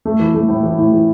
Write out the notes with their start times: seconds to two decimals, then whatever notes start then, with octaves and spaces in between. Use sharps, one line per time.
0.05 A3
0.20 E3
0.34 A3
0.48 A2
0.63 E3
0.78 A2
0.92 E3